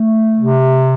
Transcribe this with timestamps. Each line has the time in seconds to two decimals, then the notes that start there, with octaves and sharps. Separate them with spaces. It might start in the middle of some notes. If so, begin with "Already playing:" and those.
Already playing: A3
0.36 C3